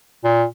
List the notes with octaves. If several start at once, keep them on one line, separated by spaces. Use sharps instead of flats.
A#2